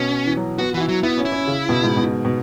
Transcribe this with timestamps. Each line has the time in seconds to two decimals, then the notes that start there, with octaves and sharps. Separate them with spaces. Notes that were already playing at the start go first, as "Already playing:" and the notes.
Already playing: B2 C#4
0.26 E3
0.37 F#3
0.58 B3 F#4
0.74 E3 F#4
0.81 E4
0.89 F#3
1.03 B3 E4
1.18 C#4
1.25 E4
1.32 C#4
1.47 C#3
1.69 B2
1.83 G#2
1.97 B2
2.25 B2